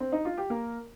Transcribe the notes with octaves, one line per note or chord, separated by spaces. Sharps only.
C4
D#4
F4
G4
A#3 A#4